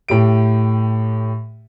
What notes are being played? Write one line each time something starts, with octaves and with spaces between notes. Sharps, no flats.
A2 G4 D7